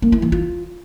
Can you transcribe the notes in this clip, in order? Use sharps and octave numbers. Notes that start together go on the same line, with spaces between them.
A#3
E4
E3
F4